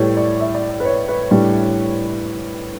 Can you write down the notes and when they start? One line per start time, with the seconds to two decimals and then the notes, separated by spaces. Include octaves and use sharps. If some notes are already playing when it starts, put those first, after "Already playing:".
Already playing: A2 G3 G4 A4 B4 C#5
0.17 D5
0.40 E5
0.54 D5
0.70 D5
0.80 B4
0.85 C#5
1.08 B4
1.31 A2 G3 D4